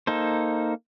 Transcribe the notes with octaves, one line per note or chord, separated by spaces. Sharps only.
A#3 D#4 A4 C5